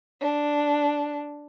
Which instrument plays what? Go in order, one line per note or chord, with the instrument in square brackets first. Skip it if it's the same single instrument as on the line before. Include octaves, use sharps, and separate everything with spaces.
[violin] D4